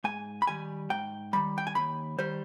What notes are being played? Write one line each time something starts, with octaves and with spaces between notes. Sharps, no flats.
G#2 G#5
B5
D#3 G3 G#5
G#2 G5
D#3 G3 B5
G5
G#5
D#2 B5
D#3 G3 C5